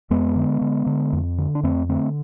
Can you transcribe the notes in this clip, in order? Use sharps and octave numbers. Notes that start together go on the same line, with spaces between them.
F2 G#3 B3
D3
D3
D3
F2
D3
D4
F2 A3 C4
D3 A3 C4